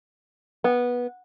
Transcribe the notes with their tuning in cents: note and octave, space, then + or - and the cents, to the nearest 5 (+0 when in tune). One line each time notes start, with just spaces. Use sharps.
B3 -15